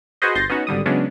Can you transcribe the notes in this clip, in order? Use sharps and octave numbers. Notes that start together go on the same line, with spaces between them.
F#4 G#4 B4 C5 D#5
G1 C6 G6 A6 A#6
B3 C#4 D#4 F#4
G#1 D3 G3 D#6
C#3 F#3 G#3 B3 C#4 D4